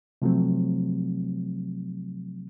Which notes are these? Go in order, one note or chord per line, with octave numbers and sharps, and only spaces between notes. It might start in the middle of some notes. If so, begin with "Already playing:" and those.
C3 F3 F#3 A3 C4